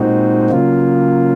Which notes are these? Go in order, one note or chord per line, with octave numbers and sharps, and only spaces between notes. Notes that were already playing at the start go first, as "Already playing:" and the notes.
Already playing: A#2 G#3 C4 D#4 F#4
C#3 F#3 A#3 F4